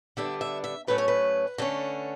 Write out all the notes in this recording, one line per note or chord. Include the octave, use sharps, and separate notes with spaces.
D3 G3 B3 D4 E5
E5
E5
A2 F#3 A3 C#4 B4
C#5
B4
D3 A3 C#4